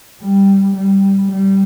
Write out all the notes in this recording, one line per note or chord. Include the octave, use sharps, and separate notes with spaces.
G3
G3
G3